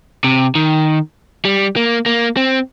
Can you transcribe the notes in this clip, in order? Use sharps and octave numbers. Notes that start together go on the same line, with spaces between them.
C3
D#3
G3
A#3
A#3
C4